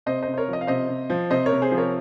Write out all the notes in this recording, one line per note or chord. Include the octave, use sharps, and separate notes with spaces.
C3 C5 D#5
C3 C5 D#5
C5
A#4 C#5
F3
D#5
F5
C3 C5 D#5
C3
F3
C3 C5 D#5
A#4 C#5
C3
G#4 C5
F3
A#4 C#5